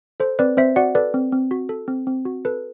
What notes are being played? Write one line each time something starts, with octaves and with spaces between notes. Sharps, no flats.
A4 C5
C4 B4 D5
C4 C5 E5
F#4 D5 F#5
A4 B4 D5
C4
C4
F#4
A4
C4
C4
F#4
A4 B4